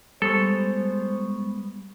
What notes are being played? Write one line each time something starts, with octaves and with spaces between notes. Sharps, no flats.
G3 G#3 B3 A4 C5 C#5